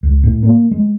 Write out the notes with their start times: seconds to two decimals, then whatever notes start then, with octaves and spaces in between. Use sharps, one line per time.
0.03 C#2
0.24 A2
0.43 A#3
0.71 G#3